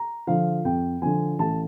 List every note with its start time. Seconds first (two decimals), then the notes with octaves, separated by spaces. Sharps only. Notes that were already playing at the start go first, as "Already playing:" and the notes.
Already playing: A#5
0.27 D3 F3 F5
0.65 F2 G5
1.02 D3 F3 G#5
1.39 A1 A5